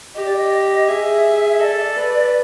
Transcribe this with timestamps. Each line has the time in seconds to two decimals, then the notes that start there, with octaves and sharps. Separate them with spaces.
0.15 G4 D#5
0.25 D5
0.37 D#5
0.87 G#4 E5
1.59 A4 D5 D#5
1.96 B4